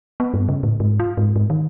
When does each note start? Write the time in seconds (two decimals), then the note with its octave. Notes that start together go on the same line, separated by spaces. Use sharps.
0.20 B3
0.34 G2
0.49 C#3
0.63 A2
0.80 G#2
1.00 F4
1.17 G#2
1.36 G#2
1.50 D#3